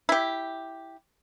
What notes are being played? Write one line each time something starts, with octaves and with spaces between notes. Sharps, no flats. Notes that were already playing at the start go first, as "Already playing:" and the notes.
E4 G4